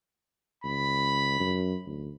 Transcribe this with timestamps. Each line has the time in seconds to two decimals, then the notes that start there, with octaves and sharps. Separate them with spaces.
0.64 C#2 B5
1.40 F#2
1.86 D2